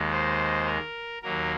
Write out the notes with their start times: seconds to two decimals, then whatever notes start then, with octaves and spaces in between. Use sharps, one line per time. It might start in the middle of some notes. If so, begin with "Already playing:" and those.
Already playing: D#2 D#3 G#3
0.11 C5
0.66 A#4
1.22 D#2 D#3 F#3 A#3 A#4